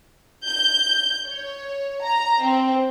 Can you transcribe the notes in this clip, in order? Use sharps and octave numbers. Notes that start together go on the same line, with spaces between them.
G6
C#5
A#5
C4